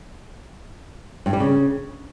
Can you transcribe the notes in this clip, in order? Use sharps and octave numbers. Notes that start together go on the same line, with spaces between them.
G2
G3
C#3